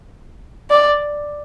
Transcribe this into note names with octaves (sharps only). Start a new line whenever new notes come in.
D5